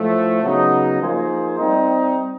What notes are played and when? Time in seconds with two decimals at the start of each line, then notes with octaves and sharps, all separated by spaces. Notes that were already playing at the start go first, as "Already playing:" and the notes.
Already playing: A2 F3 A3
0.43 C#3 F#3 B3 D#4
1.01 F3 A#3 D#4 G#4 C5
1.58 G3 C4 D#4